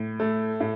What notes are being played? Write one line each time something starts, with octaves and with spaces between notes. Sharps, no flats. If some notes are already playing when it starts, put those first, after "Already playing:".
Already playing: A2
A3
A2